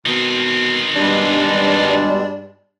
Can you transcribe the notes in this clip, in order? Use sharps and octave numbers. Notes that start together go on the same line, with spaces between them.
B2 D#3 C4
G2 B2 G3 G#3 D4